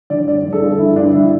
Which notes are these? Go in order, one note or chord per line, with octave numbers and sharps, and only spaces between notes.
D3 D5
G2 D5
D3
A4
G2
D3 E4
G2 D4
D3 E4